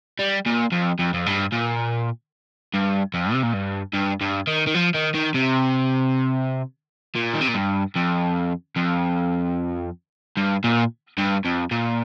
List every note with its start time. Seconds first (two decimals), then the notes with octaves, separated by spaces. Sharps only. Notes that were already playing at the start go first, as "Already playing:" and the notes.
0.19 G3
0.46 A#2
0.72 F2
0.99 F2
1.14 F2
1.26 G2
1.53 A#2
2.74 G2
3.14 F2
3.32 C3
3.43 A#2
3.54 G2
3.94 G2
4.21 G2
4.47 D#3
4.67 D#3
4.74 F3
4.94 D#3
5.14 D#3
5.34 C3
7.16 A#2
7.34 D#3
7.41 C3
7.48 A#2
7.55 G2
7.96 F2
8.76 F2
10.37 G2
10.64 A#2
11.18 G2
11.45 F2
11.71 A#2